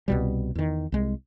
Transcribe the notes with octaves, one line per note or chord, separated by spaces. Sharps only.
C2 B2 G3
E2 D#3
C2 G#3